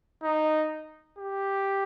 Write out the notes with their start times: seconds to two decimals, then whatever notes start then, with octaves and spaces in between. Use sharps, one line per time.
0.24 D#4
1.18 G4